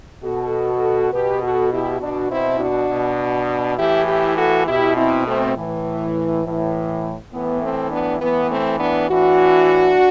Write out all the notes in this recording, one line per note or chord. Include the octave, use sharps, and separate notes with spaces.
B2 F#4 A4
B2 G4 B4
F#4 A4
E4 G4
B2 D4 F#4
C4 E4
D4 F#4
B2
A2 E3 E4 G4
E4 G4
F#4 A4
B2 E4 G4
C4 E4
A3 C4
A2 E3
A2 E3
A2 E3 B3
A3 C4
B3 D4
A2 E3 B3
A3 C4
B3 D4
A2 E3 D4 F#4